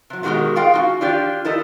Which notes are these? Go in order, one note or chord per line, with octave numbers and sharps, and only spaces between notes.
C3 F#3
B2 D#3 G#3 F#4 G4 A#4
F4 G#4 F5 G5
C#4 D#4 F#4
D4 F4 G4 D5
E4 A4 A#4 D#5